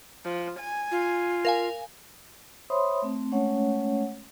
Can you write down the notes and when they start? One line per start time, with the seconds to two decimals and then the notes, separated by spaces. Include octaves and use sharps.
0.25 F3
0.60 G#5
0.91 F4
1.45 A#4 F5 G#5
2.70 C5 C#5 E5 B5 C6 D#6
3.02 A3 C4
3.32 G#3 A3 C#4 C#5 F#5